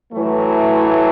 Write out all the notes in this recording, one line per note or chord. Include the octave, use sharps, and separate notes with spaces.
A2 E3 F#3 A3